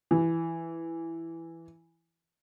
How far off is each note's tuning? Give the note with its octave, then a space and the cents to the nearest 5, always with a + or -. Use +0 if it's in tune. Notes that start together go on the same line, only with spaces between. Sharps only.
E3 +5